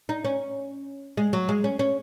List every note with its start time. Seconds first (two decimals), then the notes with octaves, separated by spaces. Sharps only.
0.09 D#4
0.25 C#4
1.17 G#3
1.33 F#3
1.49 G#3
1.64 C#4
1.79 C#4